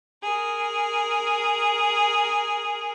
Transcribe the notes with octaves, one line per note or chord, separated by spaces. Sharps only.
G#4 A#4